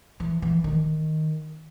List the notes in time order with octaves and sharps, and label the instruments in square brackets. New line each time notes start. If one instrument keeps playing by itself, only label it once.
[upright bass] E3
E3
D#3